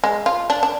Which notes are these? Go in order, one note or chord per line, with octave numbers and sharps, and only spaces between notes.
G#3
F4
D4
D4